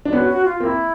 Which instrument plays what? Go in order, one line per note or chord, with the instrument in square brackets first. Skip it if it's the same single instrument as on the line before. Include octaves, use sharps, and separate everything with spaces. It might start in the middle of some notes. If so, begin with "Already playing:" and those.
[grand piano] D4
[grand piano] B3 C#4 [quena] F#4
[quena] F#4
F4
[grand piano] A#3 C4 [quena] F4
[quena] E4